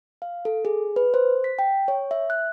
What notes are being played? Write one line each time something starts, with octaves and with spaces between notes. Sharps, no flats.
F5
A4
G#4
B4
C5
B6
G5
C#5
E5
F#6